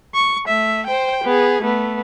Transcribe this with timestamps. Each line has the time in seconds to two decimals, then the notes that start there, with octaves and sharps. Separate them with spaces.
0.15 C#6
0.47 A3 E5
0.87 C5 G5
1.24 B3 G#4
1.62 A3 B3